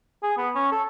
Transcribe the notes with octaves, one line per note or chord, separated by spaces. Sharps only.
G#4
B3
C#4
A4